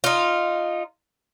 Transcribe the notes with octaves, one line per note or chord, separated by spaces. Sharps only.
D#4 F4